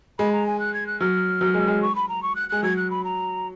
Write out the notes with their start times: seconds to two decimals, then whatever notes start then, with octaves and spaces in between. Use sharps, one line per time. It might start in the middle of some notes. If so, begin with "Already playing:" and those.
0.19 G#3 B5
0.32 A#5
0.46 G#5
0.60 F#6
0.74 G#6
0.87 F#6
1.00 F#3 F6
1.41 F#3
1.54 G#3
1.68 G#3
1.82 C#6
1.95 B5
2.09 A#5
2.22 C#6
2.36 F#6
2.49 G#3 F#6
2.63 F#3 G#6
2.77 F#6
2.90 B5
3.04 A#5